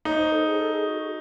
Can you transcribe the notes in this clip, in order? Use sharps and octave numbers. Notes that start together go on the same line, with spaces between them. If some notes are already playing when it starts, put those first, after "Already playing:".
D#4 C#5
C5
A4
G#4
A4
G#4
F#4